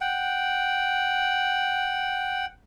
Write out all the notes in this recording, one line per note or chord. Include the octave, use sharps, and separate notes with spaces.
F#5 G5